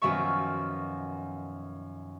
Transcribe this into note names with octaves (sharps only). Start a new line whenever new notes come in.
F#2 B2 D#3 F3 E5 C#6